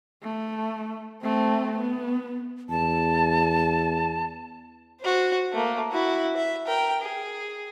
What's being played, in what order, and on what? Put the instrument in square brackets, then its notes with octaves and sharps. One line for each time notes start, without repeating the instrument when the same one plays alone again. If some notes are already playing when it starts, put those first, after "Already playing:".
[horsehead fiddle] A3
A3 C4
B3
[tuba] E2 [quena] A5
[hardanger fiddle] F#4 C5
A3 A#3
E4 F#4
E5
A#4 G5
G#4